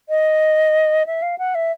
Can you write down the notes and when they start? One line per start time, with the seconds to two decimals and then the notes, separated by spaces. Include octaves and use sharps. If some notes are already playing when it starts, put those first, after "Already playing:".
0.09 D#5
1.06 E5
1.22 F5
1.38 F#5
1.55 E5